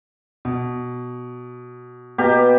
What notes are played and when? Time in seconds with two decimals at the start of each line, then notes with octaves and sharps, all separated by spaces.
0.45 B2
2.18 B2 G4 F5 A#5